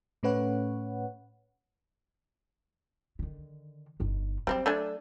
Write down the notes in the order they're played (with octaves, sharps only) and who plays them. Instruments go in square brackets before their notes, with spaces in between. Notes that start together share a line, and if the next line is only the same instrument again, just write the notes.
[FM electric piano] A2 A3 C#4 B4 C#5 F#5
[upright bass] D3 D#3
G1 D#4
[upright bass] F#3 [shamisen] G3 C4 G4
[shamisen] A3 D4 G#5